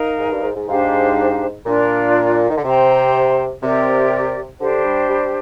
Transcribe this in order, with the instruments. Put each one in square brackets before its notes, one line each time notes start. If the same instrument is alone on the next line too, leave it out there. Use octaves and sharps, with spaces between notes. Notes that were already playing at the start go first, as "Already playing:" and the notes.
Already playing: [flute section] D#4 A#4 F5
[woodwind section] G#2
G2
G#2
G#2
[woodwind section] G#2 [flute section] D4 G4 C5 F5
[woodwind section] A#2 [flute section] D4 F4 A#4 D5
[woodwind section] D#3
D3
[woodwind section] C3 [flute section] C5 G5 A#5
[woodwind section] C3 [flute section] G4 A#4 D5
[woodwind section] D3 [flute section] D4 G4 C5
[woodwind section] G3
G3